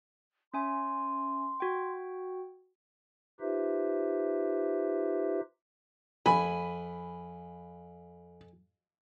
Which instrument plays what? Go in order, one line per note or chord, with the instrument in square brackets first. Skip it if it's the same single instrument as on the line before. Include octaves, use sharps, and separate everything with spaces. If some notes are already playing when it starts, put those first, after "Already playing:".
[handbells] C#4 E5 G#5 [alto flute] C6
[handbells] F#4 G5
[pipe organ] D#4 F4 G4 B4 C5 E5
[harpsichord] F2 [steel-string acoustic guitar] G#5 [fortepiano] B5